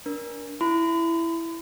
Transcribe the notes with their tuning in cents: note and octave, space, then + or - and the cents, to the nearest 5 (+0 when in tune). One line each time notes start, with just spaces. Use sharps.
D4 -20 A#4 +25
E4 +10 B5 +45